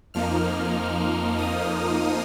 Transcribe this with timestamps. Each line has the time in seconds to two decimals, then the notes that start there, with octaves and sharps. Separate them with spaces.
0.14 F2 F3 A#3 D#4 F6
1.39 D#6